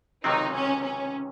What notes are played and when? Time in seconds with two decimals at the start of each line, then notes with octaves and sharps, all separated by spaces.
0.24 C#2 C3 D#3 F#3 C4 D#4
0.54 C#4
0.84 C#4